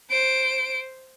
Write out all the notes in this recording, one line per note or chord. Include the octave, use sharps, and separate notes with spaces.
C5 D7